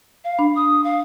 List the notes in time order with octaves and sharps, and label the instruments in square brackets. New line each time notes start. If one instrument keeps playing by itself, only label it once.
[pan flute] F5
[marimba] D4 B5
[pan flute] D#6
F5